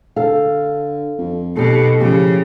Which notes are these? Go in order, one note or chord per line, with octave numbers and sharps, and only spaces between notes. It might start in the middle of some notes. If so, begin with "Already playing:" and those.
D3 A4 F5
F2
B1 B2 G4 A4
A2 C#3 F3 G4